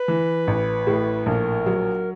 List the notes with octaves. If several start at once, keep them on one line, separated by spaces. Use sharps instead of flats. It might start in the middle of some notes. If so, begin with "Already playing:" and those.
Already playing: B4
E3
A1
A2
A#1 A#4
F#3